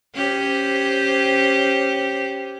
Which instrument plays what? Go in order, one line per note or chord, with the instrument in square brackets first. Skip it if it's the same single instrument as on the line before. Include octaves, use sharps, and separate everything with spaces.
[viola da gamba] C#4 G4 C5